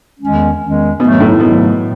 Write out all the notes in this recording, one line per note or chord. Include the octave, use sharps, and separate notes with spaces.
E2 D#3 G#3 C#4
E2 D#3 G#3 C#4
G#2 B2 D#3 F#3 A3
A2
G#2 B2 D#3 F#3 A3
A2